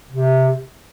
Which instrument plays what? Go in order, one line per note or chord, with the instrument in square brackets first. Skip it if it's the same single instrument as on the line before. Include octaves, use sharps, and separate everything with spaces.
[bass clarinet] C3